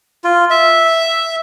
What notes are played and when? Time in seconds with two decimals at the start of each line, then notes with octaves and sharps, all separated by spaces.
0.24 F4
0.50 E5